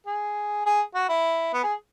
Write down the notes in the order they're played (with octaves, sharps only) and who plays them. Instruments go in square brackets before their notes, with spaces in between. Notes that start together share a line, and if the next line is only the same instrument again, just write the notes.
[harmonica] G#4
G#4
F#4
E4
B3
G#4